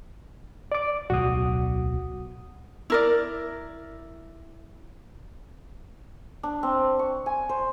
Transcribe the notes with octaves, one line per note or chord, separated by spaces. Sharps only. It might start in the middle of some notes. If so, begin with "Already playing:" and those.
D5 D6
D1 B1 F#4 D#6
E4 A#4 D5
D4
C4
C#6
G#5
C5